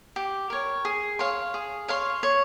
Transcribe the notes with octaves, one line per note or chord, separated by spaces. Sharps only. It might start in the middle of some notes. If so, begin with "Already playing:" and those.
G4
A#4 C#5
G#4
C#5 F5 C6
G#4
C#5 F5 C6
C#5